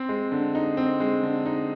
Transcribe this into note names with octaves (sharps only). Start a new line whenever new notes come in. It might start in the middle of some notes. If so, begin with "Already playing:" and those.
Already playing: C4
G#3
D3
D#4
C4
G#3
D3
D#4